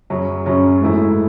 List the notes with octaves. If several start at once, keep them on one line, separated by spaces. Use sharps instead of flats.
F#2 C#3 F#3 C#4
F#2 C#3 F#3 C#4
G#2 E3 A3 E4 G#4